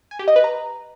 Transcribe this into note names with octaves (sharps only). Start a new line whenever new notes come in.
G#5
G4
D#5
B4
A#5